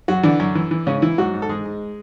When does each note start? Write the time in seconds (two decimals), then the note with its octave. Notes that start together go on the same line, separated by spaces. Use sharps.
0.08 F#2 F#3 F#4
0.23 D3 E3 D4
0.40 F#2
0.55 E3
0.71 E3
0.86 G#2 C#3 C#4
1.02 E3 E4
1.18 G#2 F#3 F#4
1.34 G#2
1.42 A4
1.49 G#2 G#3 G#4
1.65 G#2